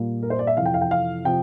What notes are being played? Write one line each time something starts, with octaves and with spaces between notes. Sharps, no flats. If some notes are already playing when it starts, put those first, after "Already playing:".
Already playing: A#2 G3 A#3
A#4
C5
D5
E5
F2 C3 E3 F5
G5
F5
G5
F5
C3 F3 G5